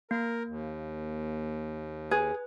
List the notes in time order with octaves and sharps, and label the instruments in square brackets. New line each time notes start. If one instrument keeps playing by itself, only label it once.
[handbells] A#3 [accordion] A#4
[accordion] D#2
[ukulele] G#4 [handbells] B4